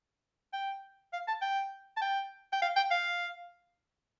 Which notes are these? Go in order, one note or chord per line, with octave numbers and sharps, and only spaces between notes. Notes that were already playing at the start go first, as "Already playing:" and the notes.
G5
F5
A5
G5
A5
G5
G5
F5
G5
F5